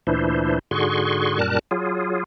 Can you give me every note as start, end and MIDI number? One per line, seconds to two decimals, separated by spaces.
0.07 0.59 38
0.07 0.59 46
0.07 0.59 52
0.07 0.59 62
0.07 0.59 64
0.07 0.59 72
0.71 1.39 44
0.71 1.39 50
0.71 1.39 66
0.71 1.39 68
0.71 1.39 84
0.71 1.39 85
1.39 1.59 42
1.39 1.59 46
1.39 1.59 55
1.39 1.59 70
1.39 1.59 81
1.39 1.59 90
1.71 2.24 54
1.71 2.24 65
1.71 2.24 68